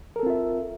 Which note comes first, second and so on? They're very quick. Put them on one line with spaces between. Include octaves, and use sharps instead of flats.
A#4 A4 C4 F4 E5